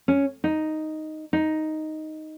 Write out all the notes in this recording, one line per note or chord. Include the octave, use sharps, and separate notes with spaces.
C#4
D#4
D#4